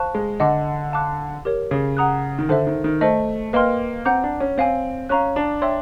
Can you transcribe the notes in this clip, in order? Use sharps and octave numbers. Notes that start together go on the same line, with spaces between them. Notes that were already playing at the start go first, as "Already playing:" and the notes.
Already playing: C5 F5 A5 C#6 F#6
G#3
D3 D#5 F#5 A5 D6
F5 A5 D6 F#6
G4 A#4 C#5
C#3
F#5 A#5 D#6 F#6
D#3
D3 A4 C5 E5
D#3
D#3
A3 A4 C5 D#5
A#3 B4 D#5 G5 C6 F6
C4 F#5 A#5 D6 G6
D4
C#4
C4 C#5 F5 G#5
C#4 F5 A#5 C#6 F#6
D4
C#5 E5 G5 C6 E6